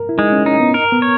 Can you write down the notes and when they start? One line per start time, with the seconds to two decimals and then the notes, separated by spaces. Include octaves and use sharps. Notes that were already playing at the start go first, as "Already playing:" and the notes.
Already playing: A#4
0.09 E4
0.18 G#3 D#4
0.32 C#4
0.46 C#4 D#4
0.60 B3
0.74 A#4
0.92 B3
1.02 C#5